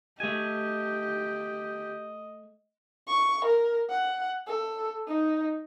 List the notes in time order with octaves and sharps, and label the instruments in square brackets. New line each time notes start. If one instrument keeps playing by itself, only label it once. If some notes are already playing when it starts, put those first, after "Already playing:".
[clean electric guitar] A3 G#5 [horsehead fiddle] G4 [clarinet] D#5
[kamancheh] C#6
A#4
F#5
A4
D#4